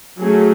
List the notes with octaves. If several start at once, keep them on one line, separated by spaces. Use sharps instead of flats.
F#3 A3 C#4 G#4